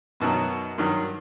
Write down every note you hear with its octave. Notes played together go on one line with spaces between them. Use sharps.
F#2 B2 D#3 F#3
G2 D#3 F#3